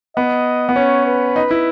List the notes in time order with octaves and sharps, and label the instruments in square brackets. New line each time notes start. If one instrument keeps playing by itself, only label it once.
[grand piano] B3 [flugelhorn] D#5
[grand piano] B3
[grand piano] C#4 [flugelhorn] C#5
[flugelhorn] B4
[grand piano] D#4
E4